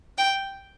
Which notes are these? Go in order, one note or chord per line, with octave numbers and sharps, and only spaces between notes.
G5